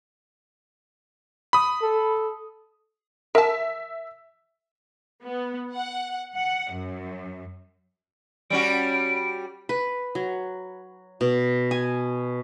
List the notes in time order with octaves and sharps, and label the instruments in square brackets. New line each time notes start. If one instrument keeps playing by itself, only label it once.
[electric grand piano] B5 D#6
[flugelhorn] A4
[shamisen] A#4 A5 [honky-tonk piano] E5
[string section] B3
F#5
F#5
F#2
[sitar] G3 C#4 F#4 [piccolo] D7
[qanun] B4
F#3
B2
G#5